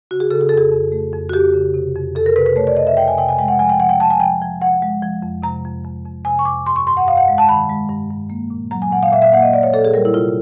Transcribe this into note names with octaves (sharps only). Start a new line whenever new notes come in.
C#3 F#4
G#4
C#3 A4
G#4
A4
F2
G#4
F2
A3
F2
F#4
F2 G4
C#3
C3
F2
F2 A4
A#4
C3 B4
B4
A3 C#5
D5
F2 D#5
E5
F2 G5
G#5
C3 G5
G#5
G#3 G5
F#5
F3 G#5
G5
F3 F#5
G5
F3 A5
G#5
F3 G5
F3
F3 F#5
G#3
F3
F2
C3 A#5
F2
F2
F2
C3 G#5
C#6
F2 D6
G2 C6
C#6
G2 C6
F#5
G2 F5
F#5
G#3
A5
D#3 B5
G#3
G2
G2
A#3
A#2
F#3 A#5
G#5
A#2 F#5
F5
A#2 E5
E5
A#3 F#5
D#5
A#2 D5
C#5
A#2 A4
G#4
G3 A#4
E4
C3 F4